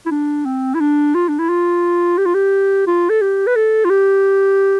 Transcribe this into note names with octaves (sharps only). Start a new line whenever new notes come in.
E4
D4
C4
E4
D4
F4
D4
E4
F4
G4
F4
G4
F4
A4
G4
B4
A4
F4
G4